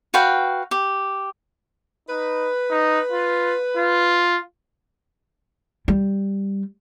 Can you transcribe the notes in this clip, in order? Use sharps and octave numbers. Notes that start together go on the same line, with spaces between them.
F#4 B4 F5 G5
G4
D#4 B4
D#4
F4
F4
G3